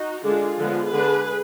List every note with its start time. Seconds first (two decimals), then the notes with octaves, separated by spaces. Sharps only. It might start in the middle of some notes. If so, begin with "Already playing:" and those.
Already playing: D#4 F#4
0.24 D3 G#3 D4 F4 G#4
0.59 D3 F3 G#3 B3
0.93 D3 G#3 D4 G#4 B4